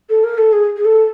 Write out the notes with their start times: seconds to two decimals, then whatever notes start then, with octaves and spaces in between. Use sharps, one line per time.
0.09 A4
0.24 A#4
0.38 A4
0.52 G#4
0.76 G#4
0.85 A4